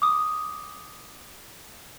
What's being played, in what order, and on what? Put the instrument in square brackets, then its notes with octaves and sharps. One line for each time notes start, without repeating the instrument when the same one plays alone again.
[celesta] D6 D#6